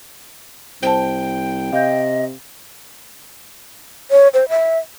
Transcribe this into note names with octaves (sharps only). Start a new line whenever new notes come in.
C2 C5 G5 A5
C3 D#5 F5 G6
C#5
C5
E5